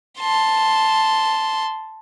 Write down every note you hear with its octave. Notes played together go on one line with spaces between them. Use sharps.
A5 C6